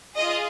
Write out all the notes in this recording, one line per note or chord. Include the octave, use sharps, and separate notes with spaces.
F4 G#4 D#5